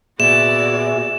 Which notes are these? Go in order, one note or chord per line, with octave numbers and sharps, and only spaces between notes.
A#2 B3 F#4 G#4 D5 E5 E7